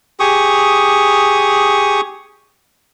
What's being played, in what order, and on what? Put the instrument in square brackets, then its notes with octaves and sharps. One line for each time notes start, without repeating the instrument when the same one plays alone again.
[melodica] G4 G#4 C#6 D#6